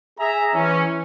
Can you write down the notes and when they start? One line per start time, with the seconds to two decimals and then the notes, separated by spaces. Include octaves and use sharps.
0.19 G#4 E5 A#5
0.54 E3 C#4